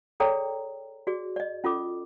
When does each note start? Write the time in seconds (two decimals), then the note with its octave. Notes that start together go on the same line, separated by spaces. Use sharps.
0.20 G#4 A4 C#5 D5 G5 A#5
1.07 F#4 G#4 D5
1.36 D5 D#5
1.64 C#4 F4 A4 D6